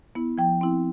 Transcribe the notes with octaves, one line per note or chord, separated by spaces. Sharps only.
B3 E4
F3 G5
C4 E4